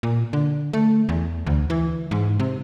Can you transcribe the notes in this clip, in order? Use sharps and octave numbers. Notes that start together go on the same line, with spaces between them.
A#2
D3
A3
E2
D2
E3
G#2
C3